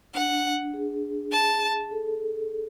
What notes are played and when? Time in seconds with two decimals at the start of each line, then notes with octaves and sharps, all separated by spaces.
0.14 D4 F#5
0.74 G#4
1.32 A5
1.91 A4